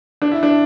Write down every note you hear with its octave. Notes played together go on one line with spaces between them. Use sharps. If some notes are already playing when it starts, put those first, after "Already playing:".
D4
E4
D4